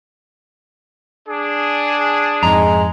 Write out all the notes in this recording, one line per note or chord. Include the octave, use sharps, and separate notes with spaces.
D4 G#4
F2 G#2 G#3 A#5